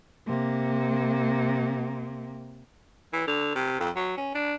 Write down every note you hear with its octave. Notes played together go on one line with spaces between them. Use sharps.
C3 A#3
E3
D3
C3
F2
F#3
C#4
D4